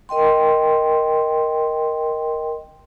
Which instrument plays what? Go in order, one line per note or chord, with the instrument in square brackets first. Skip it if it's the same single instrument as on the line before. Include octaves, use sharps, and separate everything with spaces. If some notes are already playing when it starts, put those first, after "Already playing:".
[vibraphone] A#4 D#5 G5 C6